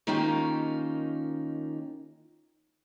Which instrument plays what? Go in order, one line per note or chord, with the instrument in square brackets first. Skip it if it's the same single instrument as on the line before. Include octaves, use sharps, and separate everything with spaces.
[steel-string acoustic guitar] D#3 A#3 C#4 D#4 F4 G4